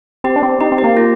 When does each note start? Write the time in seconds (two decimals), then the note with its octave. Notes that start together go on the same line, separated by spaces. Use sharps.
0.24 C4 G4
0.36 D4
0.43 C4
0.60 D#4 G4
0.72 C4
0.78 G4
0.84 A#3
0.97 F4